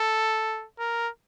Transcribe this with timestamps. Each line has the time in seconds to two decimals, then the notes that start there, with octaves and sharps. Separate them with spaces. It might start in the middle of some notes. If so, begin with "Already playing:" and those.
Already playing: A4
0.79 A#4